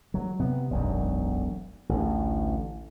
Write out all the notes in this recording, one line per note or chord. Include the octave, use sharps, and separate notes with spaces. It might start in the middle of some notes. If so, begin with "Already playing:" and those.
F#3
C3 B3
E1 B1 F#2
A1 D2